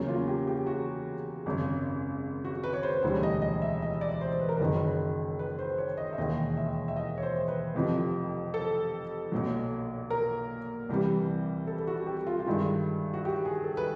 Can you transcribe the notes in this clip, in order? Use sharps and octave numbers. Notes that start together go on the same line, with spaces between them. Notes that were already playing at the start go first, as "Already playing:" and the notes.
Already playing: E2 C#3 F#3 A#3 C#4
F4
G4
G4
F#4
G#1 F#2 C#3
F#4
B4
C#5
C5
E1 D2 D3 G3 C#5
D#5
D#5
E5
D#5
D5
C5
B4
A#4
F#1 F#2 D#3 F#3 B4
B4
C5
C#5
D#5
E5
E1 D#2 D#3 D#5
E5
E5
D#5
C#5
C5
B4
F1 F2 C3 F3
A4
B1 A#2 F#3
A#4
C2 C3 E3 G3
A4
F#4
G4
F4
F4
G2 D#3 G#3 E4
F#4
G4
G#4
A4
B4